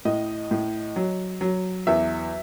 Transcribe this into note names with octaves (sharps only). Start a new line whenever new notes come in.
A2 D#5
A2
F#3
F#3
E2 E5